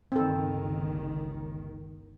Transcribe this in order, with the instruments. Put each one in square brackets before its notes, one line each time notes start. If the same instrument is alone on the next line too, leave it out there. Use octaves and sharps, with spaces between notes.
[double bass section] G1 C#2 D#3 [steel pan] C4 A4